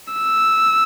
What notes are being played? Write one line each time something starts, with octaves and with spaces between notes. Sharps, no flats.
E6